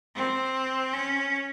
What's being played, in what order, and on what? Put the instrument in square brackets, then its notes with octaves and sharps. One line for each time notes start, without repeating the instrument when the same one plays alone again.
[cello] C4
C#4